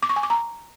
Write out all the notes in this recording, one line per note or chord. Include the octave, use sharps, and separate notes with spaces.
D6
C#6
G#5
D6
A#5